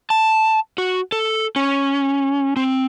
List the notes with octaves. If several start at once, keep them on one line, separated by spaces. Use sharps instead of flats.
A5
F#4
A4
C#4
C4